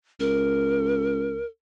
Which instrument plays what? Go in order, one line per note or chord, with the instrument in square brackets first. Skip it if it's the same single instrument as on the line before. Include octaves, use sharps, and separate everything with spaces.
[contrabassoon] C#2 [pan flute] A#4